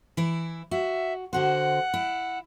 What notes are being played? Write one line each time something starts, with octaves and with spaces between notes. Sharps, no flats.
E3 E4
F#4 E5
D3 F#4 C5 F#5
E4